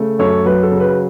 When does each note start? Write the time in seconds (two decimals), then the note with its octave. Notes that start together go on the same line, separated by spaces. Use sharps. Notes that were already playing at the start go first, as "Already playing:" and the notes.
Already playing: C#3 A3
0.19 F#2 A4 C#5
0.46 F#3 B4
0.63 A4
0.71 C#3
0.80 B4